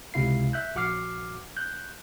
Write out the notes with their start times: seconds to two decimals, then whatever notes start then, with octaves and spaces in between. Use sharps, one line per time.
0.14 C#2 C3 E4 F5 C7
0.53 E5 F#6 G6
0.75 A#1 F#4 F#5 D6 F6 C7
1.57 F#6 G6